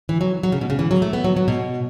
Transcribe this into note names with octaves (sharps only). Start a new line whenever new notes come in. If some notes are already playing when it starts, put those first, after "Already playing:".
E3
F#3
F#3
C#3
B2
C#3
E3
F#3
A3
B3
F#3
F#3
B2